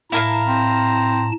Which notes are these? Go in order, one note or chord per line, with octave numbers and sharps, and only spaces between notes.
A2 E4 A#4 F5 A5 A#5
C4